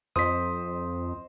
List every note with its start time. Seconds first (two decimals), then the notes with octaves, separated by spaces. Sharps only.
0.16 F2 C5 D#5 D#6 B6